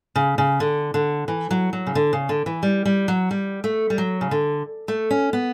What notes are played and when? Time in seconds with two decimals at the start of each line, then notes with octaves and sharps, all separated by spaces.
0.16 C#3
0.38 C#3
0.60 D3
0.94 D3
1.28 E3
1.51 F#3
1.73 F#3
1.87 C#3
1.95 D3
2.13 C#3
2.29 D3
2.46 E3
2.63 G3
2.85 G3
3.08 F#3
3.31 G3
3.64 A3
3.90 G3
3.98 F#3
4.21 C#3
4.31 D3
4.88 A3
5.10 C#4
5.33 B3